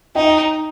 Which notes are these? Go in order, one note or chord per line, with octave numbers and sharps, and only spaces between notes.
D#4 D#5 G5